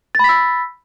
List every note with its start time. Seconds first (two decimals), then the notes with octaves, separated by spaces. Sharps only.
0.15 A6
0.19 B5
0.24 B6
0.29 E6